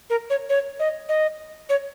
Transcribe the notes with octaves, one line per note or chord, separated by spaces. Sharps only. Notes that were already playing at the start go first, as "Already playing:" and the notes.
A#4
C#5
C#5
D#5
D#5
C#5